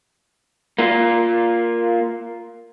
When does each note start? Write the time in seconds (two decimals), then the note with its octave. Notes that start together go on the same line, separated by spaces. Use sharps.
0.79 A#3 F4